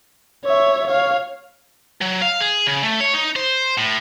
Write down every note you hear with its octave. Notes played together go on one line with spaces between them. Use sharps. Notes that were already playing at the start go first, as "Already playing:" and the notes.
C#5 E5
C#5 F5
F#3
F5
G#4
C#3
A3
C#5
D#4
C5
A2